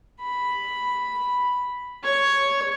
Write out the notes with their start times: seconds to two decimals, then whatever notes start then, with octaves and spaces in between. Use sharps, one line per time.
0.22 B5
2.04 C#5